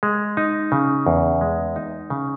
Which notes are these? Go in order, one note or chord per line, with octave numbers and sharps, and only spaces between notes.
G#3
D#4
C#3
E2
G#3
D#4
C#3